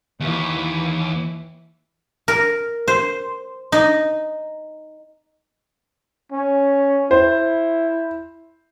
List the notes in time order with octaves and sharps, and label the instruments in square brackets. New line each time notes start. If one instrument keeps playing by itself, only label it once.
[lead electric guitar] D#2 [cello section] E3
[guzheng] A#4
C5
D#4
[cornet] C#4
[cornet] E4 [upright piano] C5